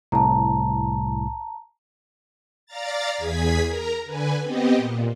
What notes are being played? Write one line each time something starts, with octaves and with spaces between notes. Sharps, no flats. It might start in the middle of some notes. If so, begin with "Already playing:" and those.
C2 A2 A5 A#5
D5 F5 A#5 A6
E2 G#4 G#6 B6
A#4 A#5
D3 B4 G#5
B3 C4 G4 D#5
A#2